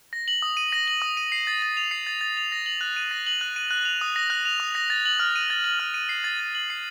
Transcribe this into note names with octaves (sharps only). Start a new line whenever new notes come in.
A#6
F#7
D#6
D#7
A#6
F#7
D#6
D#7
C7
A6
A6
F7
C7
A6
A6
F7
A#6
F#7
F#6
D#7
A#6
F#7
F#6
D#7
F#6
F7
D#6
A#6
F#6
F7
D#6
A#6
A6
F#7
F6
D#7
A6
F#7
F6
D#7
C7
A6
A6
F#7
C7